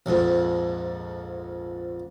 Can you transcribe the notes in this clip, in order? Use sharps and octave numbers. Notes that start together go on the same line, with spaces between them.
A#1 F2 G#2